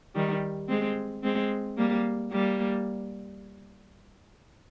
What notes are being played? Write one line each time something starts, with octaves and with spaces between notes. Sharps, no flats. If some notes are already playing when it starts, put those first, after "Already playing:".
D#3 G3
G#3 C4
G#3 C4
G3 A#3
G3 A#3